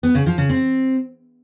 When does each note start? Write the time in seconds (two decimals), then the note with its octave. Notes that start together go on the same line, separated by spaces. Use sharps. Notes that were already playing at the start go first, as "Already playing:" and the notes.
0.03 B3
0.15 C#3
0.26 F3
0.38 C#3
0.49 C4